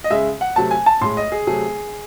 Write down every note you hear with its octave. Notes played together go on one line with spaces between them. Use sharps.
D#5
C#3 G#3 E5
F#5
C3 F#3 A3 A5
G#5
A5
A2 G#3 C6
D#5
G#4
C3 F#3 A3 G#4